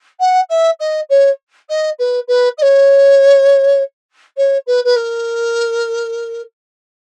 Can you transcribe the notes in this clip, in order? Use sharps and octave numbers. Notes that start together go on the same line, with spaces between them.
F#5
E5
D#5
C#5
D#5
B4
B4
D#5
C#5
C#5
B4
B4
A#4